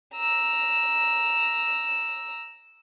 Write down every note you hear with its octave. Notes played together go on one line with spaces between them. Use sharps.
A#5 E6